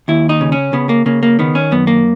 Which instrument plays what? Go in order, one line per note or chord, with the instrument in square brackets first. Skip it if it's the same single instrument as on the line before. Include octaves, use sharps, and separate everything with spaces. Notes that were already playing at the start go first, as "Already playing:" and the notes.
[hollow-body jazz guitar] D#2 E4
D#4
C#3
C#4
C#3 B3
A#3
C#3 A#3
A#3
D#3 B3
C#4
F#2 B3
A#3